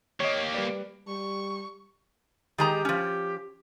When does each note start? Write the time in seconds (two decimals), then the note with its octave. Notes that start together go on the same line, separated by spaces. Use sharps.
0.20 A#3 G4 C#5 D#5
0.54 G3 B4 D5
1.08 G3 C#6
2.58 D#3 G#3 G4 A#5
2.85 F3 C#4